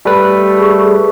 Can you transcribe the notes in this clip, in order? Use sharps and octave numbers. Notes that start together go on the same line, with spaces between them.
G3 A3 B4
G#4 C#6